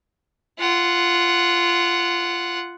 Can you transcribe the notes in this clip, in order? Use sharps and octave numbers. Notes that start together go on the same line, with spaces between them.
F4 F#5